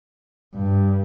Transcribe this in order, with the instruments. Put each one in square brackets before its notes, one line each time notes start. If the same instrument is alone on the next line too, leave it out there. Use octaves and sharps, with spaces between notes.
[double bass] G2